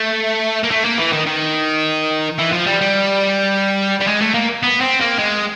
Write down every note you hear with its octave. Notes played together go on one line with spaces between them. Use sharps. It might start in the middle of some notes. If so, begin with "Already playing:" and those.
Already playing: A3
A#3
A3
A#3
E3
D#3
D#3
E3
F3
G3
G3
G3
G#3
A3
A#3
B3
C4
A#3
G#3